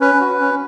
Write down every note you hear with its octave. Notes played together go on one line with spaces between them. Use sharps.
C#4 B4
F#4
C#4